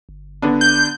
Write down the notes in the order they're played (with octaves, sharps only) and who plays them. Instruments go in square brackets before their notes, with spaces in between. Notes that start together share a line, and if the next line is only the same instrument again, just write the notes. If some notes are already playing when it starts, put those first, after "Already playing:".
[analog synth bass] G1
[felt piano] D3 B3 D4
[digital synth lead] G6